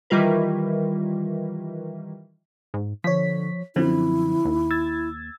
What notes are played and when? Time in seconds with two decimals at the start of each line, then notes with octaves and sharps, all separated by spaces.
0.10 D#3 E3 G3 F4 A#4 B4
2.74 G#2
3.04 D3 F3 C#5 B6
3.76 F#2 D3 F3 C4 E4
4.45 D#2
4.71 E6 G#6 A6